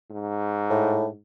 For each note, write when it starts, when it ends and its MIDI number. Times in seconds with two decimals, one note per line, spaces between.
0.11 1.19 44
0.70 1.07 45